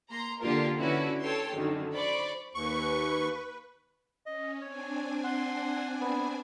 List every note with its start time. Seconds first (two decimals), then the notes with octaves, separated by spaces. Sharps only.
0.11 A#3 A#5 C6
0.41 D3 A#3 F4 G4 A#4
0.78 D3 C#4 E4 F#4 B4
1.23 A4 C#5 G5 C6
1.55 F#2 D3 D#3
1.94 C5 D5 B5 C#6
2.55 D#2 B4 C#6
4.26 C#4 D#5
4.61 C4 D4 C#5 G#5
5.24 F#5 C6
6.00 B3